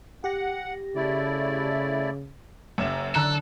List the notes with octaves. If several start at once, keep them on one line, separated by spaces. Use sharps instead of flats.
G4 F#5 A#6
C#3 A3 E4 D5
F#1 F#2 E5 E7
D3 A4 A#5 E6 F#6